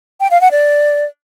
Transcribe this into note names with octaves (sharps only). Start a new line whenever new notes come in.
G5
F5
F#5
D5